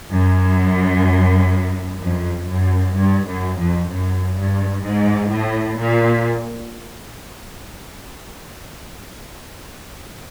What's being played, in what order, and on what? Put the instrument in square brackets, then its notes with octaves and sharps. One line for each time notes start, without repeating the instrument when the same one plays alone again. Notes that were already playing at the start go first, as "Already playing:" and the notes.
[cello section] F#2
F2
F#2
G2
F#2
F2
F#2
G2
G#2
A2
A#2